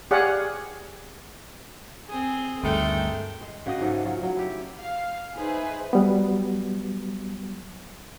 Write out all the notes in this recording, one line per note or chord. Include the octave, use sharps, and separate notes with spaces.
G4 G#4 C#5 D5 F5 F#5
C4 G#4
D2 G2 D#3 G#3 A3 G5
G#3
C#3 F#4 G4 D#5
G#2 F#3 A3 A4
F#3 F4
F#3
E4 G4
F5
D#4 G#4 B4 C5 E5
F#3 G3 B3